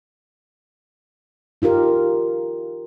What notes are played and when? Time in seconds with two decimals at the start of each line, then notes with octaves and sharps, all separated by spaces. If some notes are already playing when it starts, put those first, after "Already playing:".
1.62 D#4 F4 G4 A#4